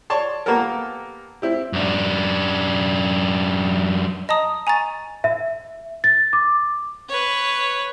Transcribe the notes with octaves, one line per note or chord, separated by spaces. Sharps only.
C#5 D5 A5 C6
A#3 B3 G4 A4 A#4
C4 E4 G4
F#2 D4
D#5 A5 A#5 D#6
G#5 A#5 C#6 A6
E5
A6
D6
B4 C#5